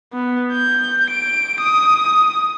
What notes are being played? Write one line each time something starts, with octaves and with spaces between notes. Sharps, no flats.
B3
G6
D7
D#6